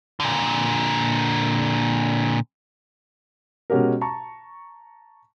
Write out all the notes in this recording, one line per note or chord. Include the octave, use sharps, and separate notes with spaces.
A#2 D3
B2 G#3 C#4 F#4 G4 A#4
A5 A#5 C#6